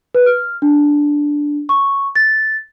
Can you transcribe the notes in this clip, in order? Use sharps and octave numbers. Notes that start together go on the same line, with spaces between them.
B4
F6
D4
C#6
A6